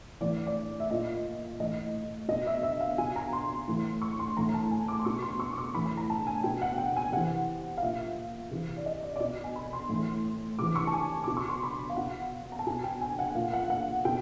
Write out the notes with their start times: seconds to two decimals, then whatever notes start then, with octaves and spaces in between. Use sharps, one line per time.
0.21 A2 E3 D5
0.47 D5
0.80 E5
0.91 A#2 D#5
1.60 A2 E3 D#5
2.28 B2 D#5
2.47 E5
2.63 E5
2.81 F5
2.98 B2 G#5
3.16 A#5
3.33 C6
3.68 A2 E3
4.02 C#6
4.19 C6
4.36 A2 E3 A#5
4.54 A5
4.71 G#5
4.88 D6
4.99 C6
5.05 B2 C#6
5.22 C6
5.40 C#6
5.53 D6
5.58 C#6
5.74 A2 E3 B5
5.86 B5
5.97 A#5
6.10 A5
6.27 G#5
6.43 B2 G5
6.62 F#5
6.78 G5
6.96 G#5
7.12 C3 E3 F#5
7.77 F5
7.82 A#2 E5
8.51 C3 E3
8.77 D5
8.86 D#5
9.03 D5
9.16 D5
9.20 B2 D#5
9.44 G#5
9.56 B5
9.73 C6
9.89 A2 E3
10.59 C3 E3 D6
10.76 C#6
10.87 A5
10.93 G#5
11.24 B2 D6
11.37 C#6
11.49 C6
11.63 B5
11.90 F5
11.97 B2 F#5
12.52 A#5
12.59 A5
12.67 B2 G#5
12.84 G5
13.01 G#5
13.19 F#5
13.35 A#2 F5
13.53 F#5
13.70 F#5
14.05 B2 G5